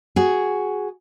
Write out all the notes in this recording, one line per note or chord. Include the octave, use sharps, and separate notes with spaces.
F#4 G#4